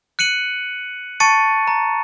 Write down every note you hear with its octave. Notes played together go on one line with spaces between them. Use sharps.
F#6 C#7 D#7 F#7
A5 C#6 A6 C#7 D#7
A#5